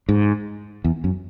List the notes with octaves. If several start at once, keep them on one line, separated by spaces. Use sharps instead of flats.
G#2
E2
F#2